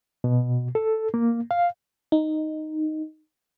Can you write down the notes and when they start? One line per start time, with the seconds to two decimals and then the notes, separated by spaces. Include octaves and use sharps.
0.24 B2
0.75 A4
1.14 A#3
1.51 F5
2.12 D#4